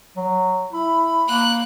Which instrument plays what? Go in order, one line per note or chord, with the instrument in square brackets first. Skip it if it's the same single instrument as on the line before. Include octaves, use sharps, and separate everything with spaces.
[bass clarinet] F#3
[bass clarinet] E4 [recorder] B5
[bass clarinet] A#3 [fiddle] F#6